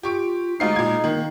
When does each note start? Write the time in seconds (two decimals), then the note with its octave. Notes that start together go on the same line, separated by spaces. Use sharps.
0.03 F4 G4 C#6 D7
0.60 D2 G#3 D#4 F5 C7
0.76 A#2 G#6
1.04 D#3 A#3